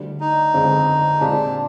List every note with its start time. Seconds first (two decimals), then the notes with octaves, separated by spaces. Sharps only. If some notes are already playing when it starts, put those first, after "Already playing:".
Already playing: D2 D3 G3
0.21 D#4
0.54 G1 F2 D3 G#3 C4
1.20 A#2 G#3 C4 D4 G4